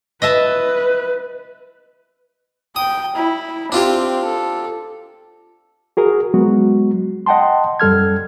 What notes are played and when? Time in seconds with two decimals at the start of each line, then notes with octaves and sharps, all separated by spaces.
0.22 B4 D#5 E5 A5
2.76 G5 D#6
3.16 E4
3.72 C4 D4 F4 G4
4.25 A4
5.97 F#4 G#4 A#4
6.34 F#3 G#3 B3 F#4
7.26 D#5 F#5 G5 A5 C6
7.80 F#2 G3 A4 F6 G#6